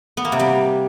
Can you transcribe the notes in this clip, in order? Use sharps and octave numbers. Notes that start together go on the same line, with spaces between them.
B3
A#3
C3
G3